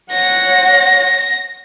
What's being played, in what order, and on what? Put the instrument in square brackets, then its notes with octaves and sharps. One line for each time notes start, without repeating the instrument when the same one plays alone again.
[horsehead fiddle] C#5 F#5 [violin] A#6